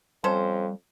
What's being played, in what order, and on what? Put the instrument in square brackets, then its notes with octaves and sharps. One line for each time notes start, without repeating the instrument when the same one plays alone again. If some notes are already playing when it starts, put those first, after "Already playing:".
[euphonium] F2 [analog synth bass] G3 [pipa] C#4 A4 C5